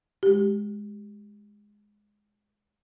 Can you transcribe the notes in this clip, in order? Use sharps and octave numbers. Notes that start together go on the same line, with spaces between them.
G#3 G4